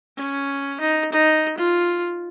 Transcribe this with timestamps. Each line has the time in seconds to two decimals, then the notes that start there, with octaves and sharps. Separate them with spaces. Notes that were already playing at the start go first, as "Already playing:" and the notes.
0.17 C#4
0.80 D#4
1.12 D#4
1.58 F4